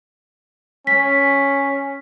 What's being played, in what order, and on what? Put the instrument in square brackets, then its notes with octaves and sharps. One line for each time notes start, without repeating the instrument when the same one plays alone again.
[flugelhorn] C#4 [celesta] B6